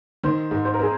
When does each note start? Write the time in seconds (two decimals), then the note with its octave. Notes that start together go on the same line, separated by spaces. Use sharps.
0.23 D#3 C5
0.51 G#2
0.65 C5
0.74 A#4
0.79 C4 G#4